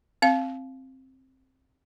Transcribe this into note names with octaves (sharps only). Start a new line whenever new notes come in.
C4 F5